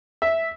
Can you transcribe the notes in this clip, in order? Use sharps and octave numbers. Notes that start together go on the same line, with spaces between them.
E5